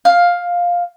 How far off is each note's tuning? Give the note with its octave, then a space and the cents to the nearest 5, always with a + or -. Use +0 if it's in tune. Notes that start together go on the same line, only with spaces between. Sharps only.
F5 +10